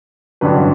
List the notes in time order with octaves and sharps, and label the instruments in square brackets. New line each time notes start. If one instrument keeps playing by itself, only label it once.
[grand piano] A1 G2 D3 F#3 B4